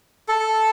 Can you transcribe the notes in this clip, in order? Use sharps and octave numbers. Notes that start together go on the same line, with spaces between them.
A4